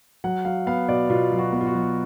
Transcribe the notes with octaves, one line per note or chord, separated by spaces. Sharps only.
F#3 F#5
F#3 F5
B3 F5
B2 D5
B2 F4
F#3
F#4
B3
F4
F#4
F#3